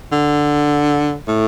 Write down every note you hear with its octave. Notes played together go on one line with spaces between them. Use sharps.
D3
A2